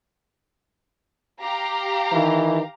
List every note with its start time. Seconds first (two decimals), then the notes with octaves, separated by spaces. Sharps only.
1.42 G4 F5 A#5
2.12 D#3 E3